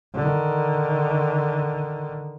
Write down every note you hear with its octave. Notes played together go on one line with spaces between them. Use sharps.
D3 D#3